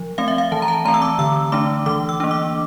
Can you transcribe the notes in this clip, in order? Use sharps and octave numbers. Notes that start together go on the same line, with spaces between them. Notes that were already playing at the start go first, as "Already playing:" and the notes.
Already playing: F3
A3 C4 F5
E5
F5
E3 A5
A#5
A5
A3 C4 A#5
E6
D6
D3 E6
A3 D4 D6
E3 D6
E6
A#3 D4
D6